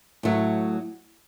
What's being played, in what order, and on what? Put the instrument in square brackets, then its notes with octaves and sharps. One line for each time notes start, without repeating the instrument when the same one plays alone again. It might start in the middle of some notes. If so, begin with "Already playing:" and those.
[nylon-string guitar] A2 F#3 A3